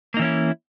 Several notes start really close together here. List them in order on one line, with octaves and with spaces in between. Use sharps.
A#3 D#4 E3 C#4 E4